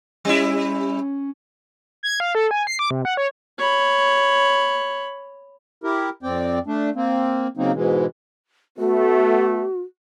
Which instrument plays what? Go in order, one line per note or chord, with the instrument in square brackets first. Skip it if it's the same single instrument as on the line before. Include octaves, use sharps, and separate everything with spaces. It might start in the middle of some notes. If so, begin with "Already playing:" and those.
[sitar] G3 E4 [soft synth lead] C#4
[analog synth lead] G#6
F5
A4
G#5
C7
D6
C3
F#5
C#5
[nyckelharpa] C#5 B5
[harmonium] E4 G4 A#4
F2 C4 D5 G5
A3 D4
A#3 C4
C#3 F#3 A#3 C4 D#4
G#2 B2 E3 G#3
[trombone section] A3 B3 [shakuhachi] F#4